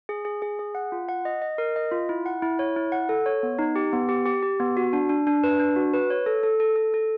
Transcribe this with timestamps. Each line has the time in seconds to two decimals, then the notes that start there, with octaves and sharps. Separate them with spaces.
0.09 G#4
0.25 G#4
0.42 G#4
0.59 G#4
0.75 F#5
0.92 F4
1.09 F#5
1.25 D#5
1.42 D#5
1.58 A#4
1.76 D#5
1.92 F4
2.09 E4
2.26 F#5
2.42 E4
2.59 C#5
2.76 E4
2.92 F#5
3.09 A4
3.26 C#5
3.43 B3
3.59 D#4
3.76 G4
3.93 B3
4.09 G4
4.25 G4
4.43 G4
4.60 B3
4.77 F#4
4.93 D4
5.09 D4
5.27 D4
5.44 B4
5.59 D4
5.76 F#4
5.94 B4
6.10 C#5
6.26 A4
6.43 A4
6.60 A4
6.76 A4
6.94 A4